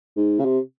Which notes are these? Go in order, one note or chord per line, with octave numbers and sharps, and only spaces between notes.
G#2
C#3
C3